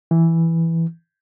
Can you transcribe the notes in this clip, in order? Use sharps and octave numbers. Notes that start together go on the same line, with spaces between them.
E3